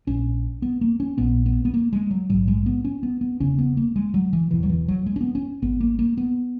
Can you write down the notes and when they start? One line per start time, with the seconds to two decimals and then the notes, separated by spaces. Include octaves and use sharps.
0.07 A#1 A#2 C#4
0.62 B3
0.81 A#3
1.00 C#4
1.18 A#1 A#2 B3
1.46 B3
1.65 B3
1.74 A#3
1.93 G#3
2.11 F#3
2.29 A#1 G#2 F#3
2.48 G#3
2.66 B3
2.85 C#4
3.03 B3
3.21 B3
3.40 E1 E2 C#3 C#4
3.58 B3
3.77 A#3
3.96 G#3
4.14 F#3
4.33 E3
4.51 E1 E2 B2 E3
4.63 F#3
4.70 E3
4.88 F#3
5.06 G#3
5.16 C#4
5.21 B3
5.35 C#4
5.62 G#1 G#2 B3
5.81 A#3
5.99 A#3
6.18 B3